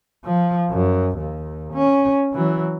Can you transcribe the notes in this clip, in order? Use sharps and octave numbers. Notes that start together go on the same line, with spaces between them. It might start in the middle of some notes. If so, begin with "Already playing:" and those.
F3
F#2
D#2
C#4
E3 F#3